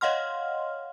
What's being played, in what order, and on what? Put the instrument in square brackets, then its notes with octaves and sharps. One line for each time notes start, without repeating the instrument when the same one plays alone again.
[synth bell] C#5 D#5 F5 F#5 C6 F6